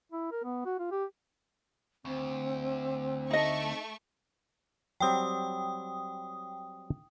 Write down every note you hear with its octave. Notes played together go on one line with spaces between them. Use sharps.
E4
A#4
B3
F#4
F4
G4
D2 C4
A3 D#4 D#5 C#6
F#3 G3 C4 G5 D#6